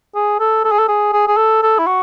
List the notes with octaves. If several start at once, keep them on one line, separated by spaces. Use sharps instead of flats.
G#4
A4
A4
G#4
A4
G#4
G#4
G#4
A4
A4
E4
F#4